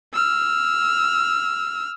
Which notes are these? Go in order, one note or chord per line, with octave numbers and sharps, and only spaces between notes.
E6 F6